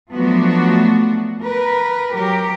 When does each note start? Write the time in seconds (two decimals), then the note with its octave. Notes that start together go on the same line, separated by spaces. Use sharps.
0.11 F3 F#3 A3 B3 D4 F#4
1.42 A#4 B4
2.13 F#3 G4 A#4